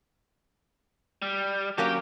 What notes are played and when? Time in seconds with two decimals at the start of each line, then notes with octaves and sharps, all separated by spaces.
1.22 G3
1.78 F#3 A#3 C#4 G4